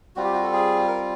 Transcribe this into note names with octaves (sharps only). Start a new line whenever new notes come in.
G3 C4 F4 F#4
G4
F#4
A4
G#4
A#4